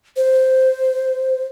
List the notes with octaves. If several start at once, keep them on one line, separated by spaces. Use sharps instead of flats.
C5